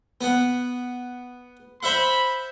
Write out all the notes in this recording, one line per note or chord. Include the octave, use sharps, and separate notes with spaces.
B3 F#5
C5 E5 F#5 B5